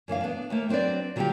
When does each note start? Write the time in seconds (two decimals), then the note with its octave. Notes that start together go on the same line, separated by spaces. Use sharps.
0.08 F#2 E3 D4 F5
0.21 B3 D4
0.50 D#2 A3 A#3
0.69 F#3 C4 D4 B4 D5
1.16 D3 F#3 G3 D#4 F4 G4